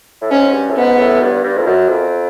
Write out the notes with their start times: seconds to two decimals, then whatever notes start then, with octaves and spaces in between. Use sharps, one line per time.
0.22 A2
0.31 G#2 C#4
0.54 G2
0.70 A2
0.76 G#2 B3
0.99 A2
1.21 G2
1.44 G2
1.58 F2
1.67 F#2
1.89 F2